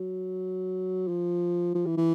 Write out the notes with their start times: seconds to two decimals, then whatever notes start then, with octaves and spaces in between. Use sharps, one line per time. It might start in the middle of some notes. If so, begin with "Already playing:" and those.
Already playing: F#3
1.08 F3
1.75 F3
1.86 E3
1.98 E3